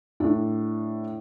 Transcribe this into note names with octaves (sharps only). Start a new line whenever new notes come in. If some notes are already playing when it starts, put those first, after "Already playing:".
A2 D4